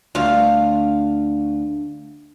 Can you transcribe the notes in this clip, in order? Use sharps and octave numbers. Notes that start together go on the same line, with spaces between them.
D2 F4 F5